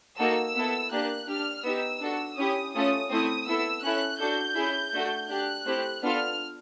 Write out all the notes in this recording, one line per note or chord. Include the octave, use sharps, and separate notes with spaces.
A#3 D#4 F#4 A4 E6
B3 E4 A4
A#3 D4 G4 F#6
D4 G4 F6
B3 D#4 G4 E6
D4 F#4 A4
C#4 E4 G4 D#6
A3 C#4 F4 A4 D#6
A3 C4 E4 D#6
B3 E4 A4 E6
C#4 E4 A4 F#6
D4 F#4 A4 G6
C#4 E4 G#4
A3 D4 F#4 A4
D4 G4 F#6
A3 C4 E4 G4
B3 D4 F4 A4 F6